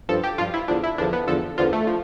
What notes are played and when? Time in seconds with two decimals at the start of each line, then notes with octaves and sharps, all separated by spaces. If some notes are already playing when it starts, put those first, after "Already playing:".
0.09 G2 F3 A4
0.24 G4
0.38 G2 F3 F4
0.54 E4
0.68 E2 D3 F3 D4
0.84 E4
0.98 E2 D3 F3 D4
1.13 B3
1.27 E2 D3 F3 A4
1.58 E2 D3 F3 F4
1.73 A3
1.87 F3